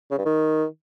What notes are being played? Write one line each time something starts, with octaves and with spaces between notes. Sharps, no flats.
C#3
G2
D#3